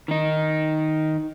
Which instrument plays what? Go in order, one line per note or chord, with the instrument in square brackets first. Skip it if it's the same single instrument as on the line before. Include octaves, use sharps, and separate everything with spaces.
[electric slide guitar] D#3 D#4